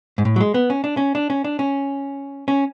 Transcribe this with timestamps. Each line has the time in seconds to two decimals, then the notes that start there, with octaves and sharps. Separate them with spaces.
0.18 G#2
0.25 A2
0.36 F#3
0.40 G#3
0.54 B3
0.70 C#4
0.84 D4
0.97 C#4
1.15 D4
1.30 C#4
1.44 D4
1.59 C#4
2.48 C#4